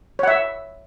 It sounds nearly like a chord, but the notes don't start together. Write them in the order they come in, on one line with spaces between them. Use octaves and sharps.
C#5 F#5 E5